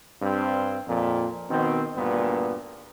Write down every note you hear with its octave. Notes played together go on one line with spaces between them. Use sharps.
G2 C4
F2 A#2
B2 D#3 C4
D2 G2 A#2 B3